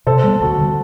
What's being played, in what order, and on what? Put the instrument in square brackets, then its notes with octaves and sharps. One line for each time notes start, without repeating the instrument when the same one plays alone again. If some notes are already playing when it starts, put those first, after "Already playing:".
[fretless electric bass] C3 [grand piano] A4 C5
[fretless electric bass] G3 B3
[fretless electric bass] D2 [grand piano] F#4 A4
[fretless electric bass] D3 G3